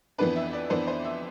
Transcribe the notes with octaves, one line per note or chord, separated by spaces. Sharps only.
F2 E3 B3 D4 B4
E5
D5
F2 E3 B3 D4 C5
C5
E5